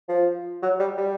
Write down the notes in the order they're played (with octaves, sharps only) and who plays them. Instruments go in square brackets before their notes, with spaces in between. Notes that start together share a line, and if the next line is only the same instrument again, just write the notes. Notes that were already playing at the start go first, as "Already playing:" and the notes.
[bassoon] F3
F#3
G3
G3